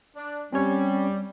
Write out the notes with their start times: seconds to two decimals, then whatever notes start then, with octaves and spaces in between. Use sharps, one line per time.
0.16 D4
0.52 G3 C4 C#4 C#5